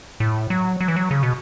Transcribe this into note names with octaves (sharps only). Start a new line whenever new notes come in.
A2
F#3
F#3
E3
F#3
C#3
B2